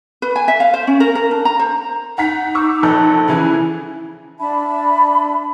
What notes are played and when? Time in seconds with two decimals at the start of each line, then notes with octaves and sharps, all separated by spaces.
0.22 B4
0.36 G#5
0.48 E5
0.60 F5
0.74 C5
0.87 C#4
1.00 A#4
1.15 A#4
1.31 D4
1.45 A#5
1.59 C5
2.18 D#4 F#5 A#5 B6
2.55 C#6 D6 E6
2.83 A#1 A4 F#6
3.28 C#3 E3 E4 G#5
4.39 D4 E5 A5 B5